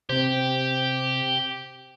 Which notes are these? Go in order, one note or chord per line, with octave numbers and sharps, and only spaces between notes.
C3 C4 G4 C5